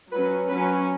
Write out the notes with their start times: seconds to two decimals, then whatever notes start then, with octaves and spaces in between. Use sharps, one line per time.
0.11 F#3 C#4 B4
0.48 F#3 C#4 B4